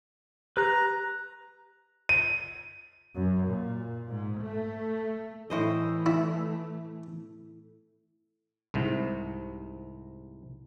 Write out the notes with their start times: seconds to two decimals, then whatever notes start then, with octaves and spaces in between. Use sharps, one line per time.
0.57 G4 B4 A#5 F#6
2.09 D#7
3.14 F#2
3.45 A#2
4.10 G#2
4.44 A3
5.50 A2 E3 A3 C5 D#5
6.06 E4
8.74 C2 G#2 C3